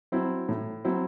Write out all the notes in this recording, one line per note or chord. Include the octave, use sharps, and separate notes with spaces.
F#3 C4 E4
A2
F#3 C4 E4